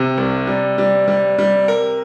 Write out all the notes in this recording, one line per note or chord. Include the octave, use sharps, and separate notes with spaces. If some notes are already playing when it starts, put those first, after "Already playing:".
Already playing: C3
C2
G3
G3
G3
G3
A#4